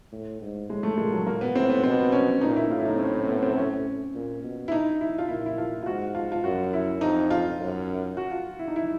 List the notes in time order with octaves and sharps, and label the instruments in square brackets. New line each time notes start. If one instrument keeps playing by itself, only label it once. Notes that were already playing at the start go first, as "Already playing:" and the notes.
[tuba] A2
G#2
[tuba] A2 [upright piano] G#3
[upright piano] A3
[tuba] A#2 [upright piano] G#3
[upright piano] F#3
[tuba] A#2 [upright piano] A#3
[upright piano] B3
[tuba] A2 [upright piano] C4
[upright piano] B3
[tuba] B2 [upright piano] C4
[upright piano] C#4
[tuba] A#2 [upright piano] D#4
[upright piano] E4
[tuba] A2 [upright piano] F4
[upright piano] E4
D#4
C4
C#4
C4
B3
C4
C#4
[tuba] A#2
B2
[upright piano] E4
D#4
E4
F4
[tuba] A#2 [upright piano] E4
[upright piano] E4
F4
F4
[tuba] G#2 [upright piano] F#4
[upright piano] F4
F4
[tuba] F#2 [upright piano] F#4
[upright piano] E4
[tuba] F2 [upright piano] D#4
[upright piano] F4
[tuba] F#2
[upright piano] F#4
F4
E4
D#4
E4